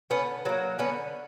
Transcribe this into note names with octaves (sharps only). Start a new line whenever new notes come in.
D3 B3 C#4
F#3 A#3 B3
D3 B3 C#4